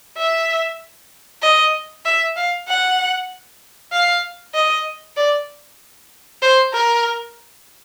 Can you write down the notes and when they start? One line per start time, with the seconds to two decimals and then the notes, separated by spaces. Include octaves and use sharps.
0.17 E5
1.42 D#5
2.05 E5
2.36 F5
2.68 F#5
3.92 F5
4.55 D#5
5.16 D5
6.42 C5
6.74 A#4